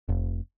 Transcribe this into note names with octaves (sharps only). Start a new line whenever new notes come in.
F1